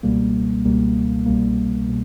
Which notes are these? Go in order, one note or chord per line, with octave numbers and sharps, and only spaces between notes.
C#2 B2 G3 A#3
C#2 B2 G3 A#3
C2 B2 G3 A#3
B2